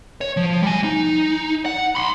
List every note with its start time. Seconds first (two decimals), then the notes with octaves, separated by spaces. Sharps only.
0.21 C#5
0.37 F3
0.63 G3 G#5
0.84 D#4
1.66 F#5
1.95 B5 C6